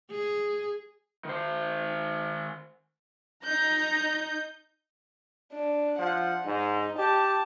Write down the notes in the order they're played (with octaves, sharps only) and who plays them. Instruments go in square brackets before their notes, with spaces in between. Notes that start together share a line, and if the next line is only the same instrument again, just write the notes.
[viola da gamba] G#4
[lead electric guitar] D#3 C5
[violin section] D#4 G6 [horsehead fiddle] A#5
[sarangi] D4
[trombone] F3 [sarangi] F#5
[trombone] G#2 [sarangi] D#4
[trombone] G4 [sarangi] A5